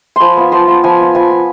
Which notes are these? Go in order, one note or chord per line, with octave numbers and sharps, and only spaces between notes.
F3 G#5 B5 C6
B3 F4
F3 A5 C6
B3 F4
F3 G#5 B5
B3 F4
F3 G#5 B5
B3 F4